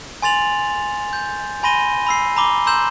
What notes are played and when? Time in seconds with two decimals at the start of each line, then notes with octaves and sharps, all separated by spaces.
0.22 G#5 C6 A6 F7 F#7
1.13 G6
1.63 G#5 B5 C6 A#6 D#7 G7
2.07 B5 E6 C7
2.36 A#5 B5 D6 G7
2.67 A#5 C6 E6 G6 E7 F#7